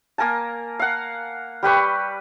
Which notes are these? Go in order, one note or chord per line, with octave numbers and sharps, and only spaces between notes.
A#3 A#4 G#5 A5
F5 F#5
G3 G4 B4 C#6